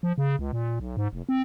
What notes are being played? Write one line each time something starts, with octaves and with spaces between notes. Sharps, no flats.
F3
C#3
C#2
A#2
B1
G#2
F1
C4